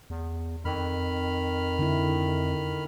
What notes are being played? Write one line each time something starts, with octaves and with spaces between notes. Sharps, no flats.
E2
F2 D#3 B5 F6
D3 E4